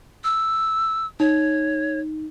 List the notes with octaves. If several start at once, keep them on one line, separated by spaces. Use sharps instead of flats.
E6
D#4 C#5